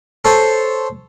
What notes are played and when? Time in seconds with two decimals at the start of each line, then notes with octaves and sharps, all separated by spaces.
0.25 A4 C5 C#5